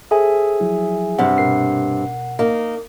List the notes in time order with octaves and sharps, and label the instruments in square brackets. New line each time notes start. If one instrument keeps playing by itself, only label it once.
[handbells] G#4 E5 G#5 [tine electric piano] A4 C5
[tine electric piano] F3 F#3 E4
[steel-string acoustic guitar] G2 C3 [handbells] F#5
[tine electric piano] B2 A#4 C7
[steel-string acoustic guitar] A#3 D#4